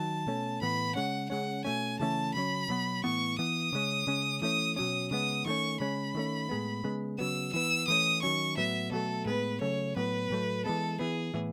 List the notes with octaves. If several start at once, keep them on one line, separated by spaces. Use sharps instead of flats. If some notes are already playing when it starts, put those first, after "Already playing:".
Already playing: D#3 F#3 A5
B2 A3 C#4
A2 E3 B3 B5
C#3 G#3 C#4 F#5
C#3 G#3 C#4 F#5
B2 A3 C#4 G#5
C#3 E3 A3 C#4 A5
C#3 F#3 C#4 B5
B2 F#3 B3
A2 E3 B3 C#6
E3 B3 D#6
C#3 G#3 C#4
C#3 G#3 C#4
E3 A3 C#4 D#6
B2 F#3 C#4 D#6
C#3 G#3 B3 D#6
D#3 F#3 A3 C#4 C#6
C#3 G#3 C#4 B5
D#3 A3 C#4
A2 G#3 B3
C#3 G#3 B3
C#3 F#3 B3 E6
E3 B3 E6
E3 A3 C#4 D#6
D#3 F#3 C#4 C#6
A2 F#3 B3 E5
B2 F#3 A3 A4
A2 G#3 B3 B4
C#3 F#3 A3 C#4 C#5
A2 F#3 B3 B4
A2 F#3 A3
E3 G#3 B3 A4
E3 B3 G#4
A2 E3 B3